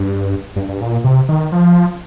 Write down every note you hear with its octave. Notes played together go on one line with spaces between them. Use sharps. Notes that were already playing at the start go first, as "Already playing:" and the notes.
Already playing: G2
G2
G2
A#2
C3
D#3
F3